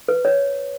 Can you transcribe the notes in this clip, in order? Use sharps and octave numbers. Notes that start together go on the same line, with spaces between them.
B4
C#5